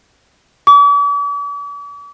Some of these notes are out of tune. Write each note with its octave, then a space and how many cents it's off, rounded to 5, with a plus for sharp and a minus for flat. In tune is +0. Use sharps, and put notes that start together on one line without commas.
D6 -45